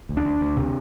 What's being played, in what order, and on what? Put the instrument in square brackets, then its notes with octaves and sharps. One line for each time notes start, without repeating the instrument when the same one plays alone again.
[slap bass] D2
D4
D2
D2
C3